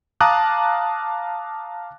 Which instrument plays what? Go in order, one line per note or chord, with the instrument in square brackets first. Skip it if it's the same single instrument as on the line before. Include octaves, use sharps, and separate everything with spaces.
[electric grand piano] F5 A5 A#5 D6 D#6 F#6